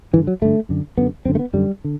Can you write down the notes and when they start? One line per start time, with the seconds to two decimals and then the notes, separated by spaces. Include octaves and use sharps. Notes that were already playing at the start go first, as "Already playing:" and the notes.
0.13 G2 D3 E3
0.27 F#3
0.42 G2 D3 A3
0.69 F#2 D3
0.97 F#2 D3 B3
1.25 F#2 C4
1.28 D3
1.35 A3
1.39 B3
1.53 F#2 D3 G3
1.84 D3